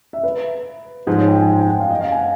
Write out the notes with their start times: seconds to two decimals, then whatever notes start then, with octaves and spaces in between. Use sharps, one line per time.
0.13 E5
0.23 B4
1.07 G#2 F3 G#3 C5
1.18 C#5
1.28 G5
1.38 G#5
1.48 G#5
1.59 G5
1.69 F#5
1.80 F5
1.91 D#5
2.00 F5
2.12 G#5
2.17 F#5